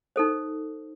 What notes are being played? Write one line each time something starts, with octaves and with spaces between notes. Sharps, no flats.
D#4 A4 C5